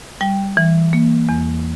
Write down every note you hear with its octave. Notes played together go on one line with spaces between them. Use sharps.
G3 G5
E3
A#3
E2